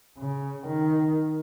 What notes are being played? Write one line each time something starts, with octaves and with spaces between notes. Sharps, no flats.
C#3
D#3